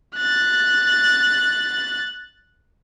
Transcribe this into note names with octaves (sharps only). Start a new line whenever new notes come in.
F#6 A6